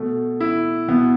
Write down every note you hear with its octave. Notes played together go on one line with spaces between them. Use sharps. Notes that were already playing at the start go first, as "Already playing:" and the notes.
Already playing: B2 A3
E4
B2 B3